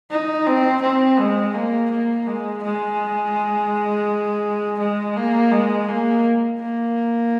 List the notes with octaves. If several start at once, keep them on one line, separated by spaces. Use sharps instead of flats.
D#4
C4
C4
G#3
A#3
A#3
G#3
G#3
G#3
A#3
G#3
A#3
A#3